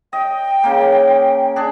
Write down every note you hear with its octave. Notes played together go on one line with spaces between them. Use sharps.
D#5 G5
C#3 A#3
D4 G#4